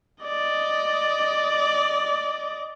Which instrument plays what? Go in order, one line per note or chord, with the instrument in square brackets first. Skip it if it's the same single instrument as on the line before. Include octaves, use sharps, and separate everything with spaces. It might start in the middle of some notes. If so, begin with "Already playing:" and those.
[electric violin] D5 D#5